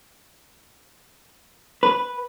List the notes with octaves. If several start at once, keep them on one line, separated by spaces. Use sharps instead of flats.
B4